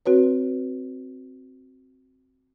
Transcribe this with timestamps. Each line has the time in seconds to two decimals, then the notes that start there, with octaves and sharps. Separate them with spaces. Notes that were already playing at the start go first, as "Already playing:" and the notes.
0.06 C4 F#4 B4 C#5